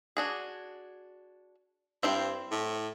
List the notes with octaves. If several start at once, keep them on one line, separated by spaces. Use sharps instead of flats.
D4 F#4 G#4
G2 C4 E4 C5
A2